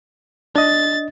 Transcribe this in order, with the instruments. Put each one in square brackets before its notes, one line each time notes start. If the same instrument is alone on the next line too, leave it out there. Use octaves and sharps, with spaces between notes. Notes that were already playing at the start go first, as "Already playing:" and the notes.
[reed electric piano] D4 D#5 [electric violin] A6